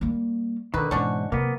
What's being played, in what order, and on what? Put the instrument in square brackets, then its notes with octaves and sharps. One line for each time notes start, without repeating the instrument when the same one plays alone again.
[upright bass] G3 A#3
[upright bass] B1 [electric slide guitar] D3 D#3 [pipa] B4
[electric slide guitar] G#2 [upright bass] B2 E3 [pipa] C#4 D4 F#4
[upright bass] C3 F#3 [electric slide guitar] A#3 B3